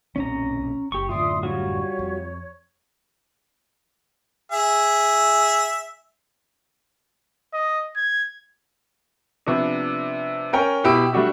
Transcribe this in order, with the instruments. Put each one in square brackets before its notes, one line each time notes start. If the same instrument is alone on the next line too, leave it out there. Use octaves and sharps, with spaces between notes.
[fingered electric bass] B1 A#2 C4 [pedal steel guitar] C#4 A#5
[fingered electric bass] F#1 [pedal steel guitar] G4 C#6
[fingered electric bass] F#2 A2 D3 [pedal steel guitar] F4 D5 [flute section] E5 C6 D#6
[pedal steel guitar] G3 F4 F#4 [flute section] C#5
[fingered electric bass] F2
[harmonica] G#4 E5
[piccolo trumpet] D#5
G#6
[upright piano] C3 F3 B3 D4
C#4 A#4 G5 G#5
B2 E4 G4 B5 E6 D7
G3 A3 D4 F#4 G4